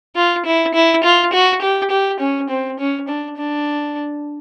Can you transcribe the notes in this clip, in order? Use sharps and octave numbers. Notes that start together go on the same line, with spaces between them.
F4
E4
E4
F4
F#4
G4
G4
C#4
C4
C#4
D4
D4